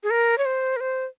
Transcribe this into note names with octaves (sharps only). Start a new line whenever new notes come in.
G#4
A#4
C#5
C5
A#4
C5